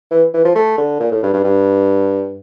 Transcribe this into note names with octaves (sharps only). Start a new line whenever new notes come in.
E3
E3
F3
A3
D3
A#2
A2
G2
G2
G2